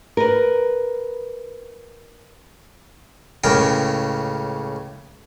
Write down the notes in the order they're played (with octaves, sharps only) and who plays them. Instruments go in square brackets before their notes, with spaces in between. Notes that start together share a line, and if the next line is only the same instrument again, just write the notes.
[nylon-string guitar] A#4 B4
[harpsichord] C#2 A2 C#3 A#4 G5